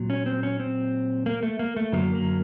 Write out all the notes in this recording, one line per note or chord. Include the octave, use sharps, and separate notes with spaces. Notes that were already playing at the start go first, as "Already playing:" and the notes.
Already playing: A#2 F#3
C#4
C4
C#4
C4
A#3
A3
A#3
A3
F#2 D3 F#3 A#3
A#3